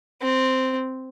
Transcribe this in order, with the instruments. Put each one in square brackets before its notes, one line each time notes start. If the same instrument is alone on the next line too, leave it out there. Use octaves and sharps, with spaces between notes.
[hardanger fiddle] C4